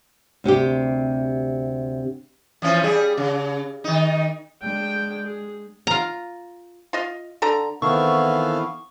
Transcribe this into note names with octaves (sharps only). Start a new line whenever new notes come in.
D2 C3 C4 G4
E3 F3 C#4
G3 G#4
C#3
D#3 D#4
G#3 D4 G5
G#4
F4 A#5
F4 D#5 F5
D3 A4 A#5
D#3 E3 B3 C4 E4 A4 F5 C#6